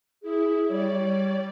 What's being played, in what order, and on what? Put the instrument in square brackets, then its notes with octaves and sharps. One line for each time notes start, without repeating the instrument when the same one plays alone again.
[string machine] E4 [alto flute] G#4
[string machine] G3 D5 [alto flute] C#5